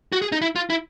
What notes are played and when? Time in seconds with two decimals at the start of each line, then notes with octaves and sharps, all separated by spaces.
0.12 F#4
0.22 G#4
0.32 D#4
0.42 E4
0.56 F4
0.70 E4